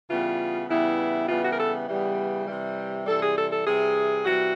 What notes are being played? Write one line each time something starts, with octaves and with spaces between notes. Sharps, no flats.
C#3 E3 G3 B3 F4
C#3 E3 G3 B3 E4
C#3 E3 G3 B3 F4
F#4
A#4
A4
C#3 E3 G3 B3
C3 E3 G3
C3 E3 G3 A4
G#4
A4
A4
C3 E3 G3 G#4
C3 E3 G3 F#4